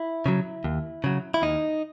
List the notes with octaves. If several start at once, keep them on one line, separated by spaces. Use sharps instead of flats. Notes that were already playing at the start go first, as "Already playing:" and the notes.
Already playing: E4
C#3 F#3
D#2
C#3 F#3
E4
D#2 D#4